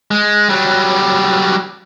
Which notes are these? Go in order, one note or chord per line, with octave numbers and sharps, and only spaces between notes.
G#3
F#3 G3